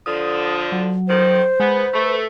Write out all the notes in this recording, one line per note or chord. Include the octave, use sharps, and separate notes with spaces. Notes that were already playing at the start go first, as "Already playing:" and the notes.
D3 F3 D#6
F#3
F2 D#3 C5
G#3 B3
A3 B4